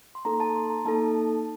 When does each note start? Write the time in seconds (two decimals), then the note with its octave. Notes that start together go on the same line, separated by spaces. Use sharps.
0.15 C6
0.25 A#3 D#4 A4 A#5
0.40 A5
0.55 C6
0.70 A#5
0.85 A#3 D#4 A4 A5